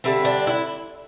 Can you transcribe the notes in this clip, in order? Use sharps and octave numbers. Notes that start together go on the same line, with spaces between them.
D3 G3 C4 E5
D4
E4